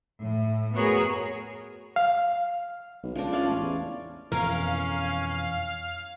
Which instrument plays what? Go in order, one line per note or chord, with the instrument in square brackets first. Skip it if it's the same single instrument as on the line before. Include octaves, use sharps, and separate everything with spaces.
[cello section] A2
B3 F#4 G#4 A#4 C#5
[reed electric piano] F5
[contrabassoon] B1
[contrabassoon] C#2 [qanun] F3 D4
[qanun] C#4 D5 F5
[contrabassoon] A1
E2
[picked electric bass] F2 B2 E3 [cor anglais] C#4 [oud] A#4 [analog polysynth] F5